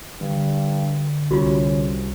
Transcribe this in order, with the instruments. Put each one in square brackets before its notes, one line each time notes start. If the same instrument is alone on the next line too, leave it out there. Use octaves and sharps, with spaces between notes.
[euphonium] G2 [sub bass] D3
[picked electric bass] C2 [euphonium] C#4 [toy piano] F4 F#4